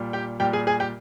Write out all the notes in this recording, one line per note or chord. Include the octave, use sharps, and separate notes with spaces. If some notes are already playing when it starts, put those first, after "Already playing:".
Already playing: A#2 G3
G4 G5
A#2 G3 G4 G5
G#4 G#5
G#4 G#5
G4 G5